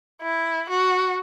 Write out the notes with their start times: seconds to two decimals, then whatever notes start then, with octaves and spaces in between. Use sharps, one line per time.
0.22 E4
0.69 F#4